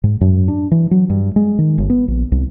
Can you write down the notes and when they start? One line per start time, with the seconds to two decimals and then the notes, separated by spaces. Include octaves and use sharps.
0.04 G#2
0.21 F#2
0.48 D4
0.71 E3
0.91 F#3
1.10 G2
1.36 G#3
1.59 D#3
1.78 G1
1.90 B3
2.08 A#1
2.32 C2